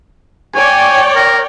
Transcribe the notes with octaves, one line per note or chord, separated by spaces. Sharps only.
C#5 D5 G5 G#5
A#4